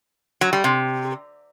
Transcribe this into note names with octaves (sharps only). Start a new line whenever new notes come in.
F#3
G3
C3